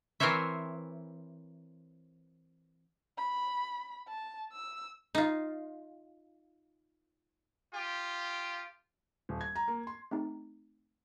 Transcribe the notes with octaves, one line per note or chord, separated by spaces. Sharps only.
E3 C4 A#4 C5 C#5 E5
B5
A5
E6
D#4 F4
F4 G4
D#1
G#6
A#5
A#3
C6
A3 C4 D#4 G4